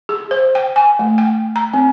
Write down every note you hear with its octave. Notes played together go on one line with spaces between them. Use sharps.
G#4
C5
G5
G#5
A3
G5
A#5
C4